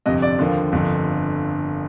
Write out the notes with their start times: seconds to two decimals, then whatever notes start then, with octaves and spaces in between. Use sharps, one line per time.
0.06 G1 F2 C3 D#5
0.22 D5
0.39 D#2 D3 F3
0.72 G1 F2 D3 F3